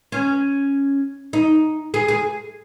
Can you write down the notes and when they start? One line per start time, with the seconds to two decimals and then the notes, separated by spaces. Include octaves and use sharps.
0.12 C#4
1.33 D#4
1.94 G#4
2.08 G#4